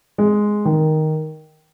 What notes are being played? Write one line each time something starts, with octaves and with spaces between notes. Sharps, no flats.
G#3
D#3